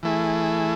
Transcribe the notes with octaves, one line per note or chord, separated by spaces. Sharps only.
E3 A3 E4 G#4